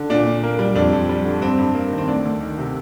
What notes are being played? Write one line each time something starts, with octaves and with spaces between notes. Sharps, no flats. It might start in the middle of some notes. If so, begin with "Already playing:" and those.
Already playing: D3
A#2 D4
A#2
A#3
G3
F2 D4
F2
G3
D3
G2 C4
G2
A#3
D#3
C4
D2 D4
D2
D#3
C3